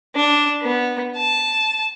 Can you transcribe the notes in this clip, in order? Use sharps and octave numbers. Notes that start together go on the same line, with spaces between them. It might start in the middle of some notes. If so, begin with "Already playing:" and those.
D4
B3
A5